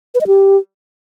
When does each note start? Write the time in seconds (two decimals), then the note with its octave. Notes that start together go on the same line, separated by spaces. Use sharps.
0.15 B4
0.21 D#5
0.27 G4